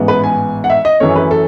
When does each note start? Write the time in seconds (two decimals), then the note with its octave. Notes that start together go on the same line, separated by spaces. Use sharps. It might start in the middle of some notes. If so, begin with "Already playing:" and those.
Already playing: A1 G#2 E3 B3
0.08 B4
0.24 G#5
0.64 F#5
0.70 E5
0.85 D#5
1.00 F#2 E3 A3 C#4 C#5
1.15 B4
1.31 A4